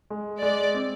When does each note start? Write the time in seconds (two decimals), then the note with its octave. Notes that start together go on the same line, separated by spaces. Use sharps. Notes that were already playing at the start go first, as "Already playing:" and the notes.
0.10 G#3
0.42 G#3 D5
0.74 C4